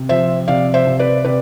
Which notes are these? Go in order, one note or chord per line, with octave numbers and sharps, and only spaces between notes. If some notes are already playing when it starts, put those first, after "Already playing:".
Already playing: C3
F3 C5 E5
C3 D5 F5
C5 E5
C3
B4 D5
C3 B4 D5